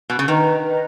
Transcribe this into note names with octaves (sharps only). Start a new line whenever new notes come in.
B2
C#3
D#3 B4 D#5 A#5
B4 D#5 A#5